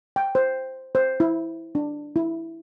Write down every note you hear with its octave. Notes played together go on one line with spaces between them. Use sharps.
G5
C5
C5
E4
D4
E4